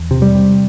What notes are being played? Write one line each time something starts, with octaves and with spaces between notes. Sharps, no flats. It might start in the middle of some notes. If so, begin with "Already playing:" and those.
Already playing: E2
C3
G3
C3